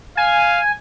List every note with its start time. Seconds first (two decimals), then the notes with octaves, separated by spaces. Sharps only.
0.17 F5 G#5